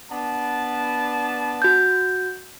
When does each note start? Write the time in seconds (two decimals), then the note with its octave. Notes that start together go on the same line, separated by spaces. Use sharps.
0.11 B3 D4 A5
1.62 F#4 G6